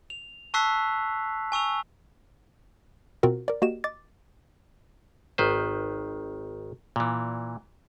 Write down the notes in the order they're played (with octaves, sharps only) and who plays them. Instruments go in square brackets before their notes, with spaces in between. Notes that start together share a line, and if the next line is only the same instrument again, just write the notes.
[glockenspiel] F7
A5 C#6 E6 F#6 B6 C7
G#5 C#6 E6 F7
[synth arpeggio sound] B2 C4 F4 F#4 A#4
A#4 D5
A#3 F#4 G4 D#5 E7
D#5 D6 A6
[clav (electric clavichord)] G#1 D#3 B4 C5
A#2 E3